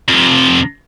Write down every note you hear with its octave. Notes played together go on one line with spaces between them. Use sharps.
F2 C3